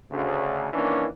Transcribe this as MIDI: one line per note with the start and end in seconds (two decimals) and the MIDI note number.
0.10 0.67 38
0.10 0.67 49
0.72 1.06 51
0.72 1.06 52
0.72 1.06 58
0.72 1.06 61
0.72 1.06 62